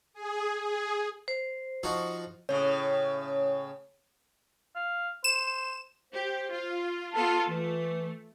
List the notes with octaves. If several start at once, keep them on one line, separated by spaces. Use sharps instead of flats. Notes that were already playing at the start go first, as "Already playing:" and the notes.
G#4
G#4
C5
F3 D#4 F#4
A2 C#3 C#5
F5
C5 E7
G4 C5
F4
B3 F4 A4 A5
E3 A3